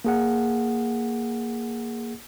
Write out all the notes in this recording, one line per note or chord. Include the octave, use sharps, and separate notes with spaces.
A#3 G#4 F#5